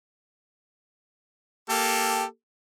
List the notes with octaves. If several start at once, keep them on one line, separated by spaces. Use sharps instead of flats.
A#3 G4 A4